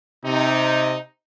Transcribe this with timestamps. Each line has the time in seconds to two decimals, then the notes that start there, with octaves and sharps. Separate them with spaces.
0.25 C3 D#4